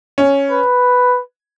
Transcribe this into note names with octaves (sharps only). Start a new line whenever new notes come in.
C#4
B4